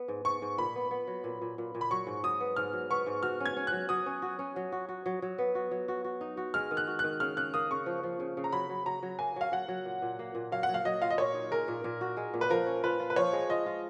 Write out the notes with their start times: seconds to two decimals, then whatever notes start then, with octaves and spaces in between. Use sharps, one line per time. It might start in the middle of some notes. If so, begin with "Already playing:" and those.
Already playing: B3
0.08 G#2
0.25 G#2 C#6
0.42 G#2
0.58 A#2 B5
0.75 B3
0.91 B3
1.07 F#3
1.24 A#2
1.41 A#2
1.58 A#2
1.75 A#2
1.81 B5
1.91 F#3 C#6
2.07 G#2
2.24 F#3 D#6
2.40 B3
2.56 G#2 F6
2.73 F#3
2.90 B3 C#6
3.06 G#2
3.23 F#4 F6
3.40 C#4
3.46 G#6
3.57 C#4
3.67 F#6
3.72 F#3
3.89 F#3 D#6
4.06 C#4
4.22 F#4
4.39 C#4
4.56 F#3
4.72 F#4
4.89 F#4
5.06 F#3
5.22 F#3
5.38 B3
5.55 F#4
5.71 F#3
5.88 F#4
6.04 F#4
6.21 D#4
6.37 F#4
6.54 G#3 F6
6.71 D#3
6.77 F#6
6.87 F#4
6.99 D#3 F#6
7.20 C#3 F6
7.37 C#3 F#6
7.54 A#3 D#6
7.71 C#3 C#6
7.86 F3
8.03 F3
8.20 C#3
8.37 C#3
8.44 A#5
8.52 F#3 B5
8.69 F#3
8.86 F#3 A#5
9.03 F#3
9.19 A#3 G#5
9.36 F#3 F5
9.52 F#3 F#5
9.68 F#3
9.85 A#2
10.02 A#2
10.19 A#3
10.35 A#2
10.52 F#3 F5
10.63 F#5
10.69 F#3
10.74 F5
10.85 F#3 D#5
11.02 F4 F5
11.10 D#5
11.18 A#2 C#5
11.34 D#4
11.51 G#3 A#4
11.68 A#2
11.84 A#2
12.01 F#4
12.17 G#3
12.34 A#2
12.41 B4
12.50 F3 A#4
12.66 C#4
12.84 F4 B4
13.00 F4
13.10 B4
13.16 F3 C#5
13.33 G#3
13.49 F4 D#5
13.66 F4